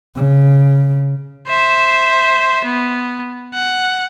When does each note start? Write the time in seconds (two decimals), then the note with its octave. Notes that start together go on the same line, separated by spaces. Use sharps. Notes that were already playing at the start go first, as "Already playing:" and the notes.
0.15 C#3
1.48 C5 E5
2.65 B3
3.54 F#5